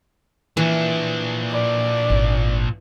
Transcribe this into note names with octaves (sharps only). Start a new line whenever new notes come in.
A#2 E3 D4
D5
G#1